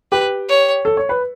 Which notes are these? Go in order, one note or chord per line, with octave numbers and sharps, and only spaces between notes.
G4 B4
C#5
A4
C#5
B4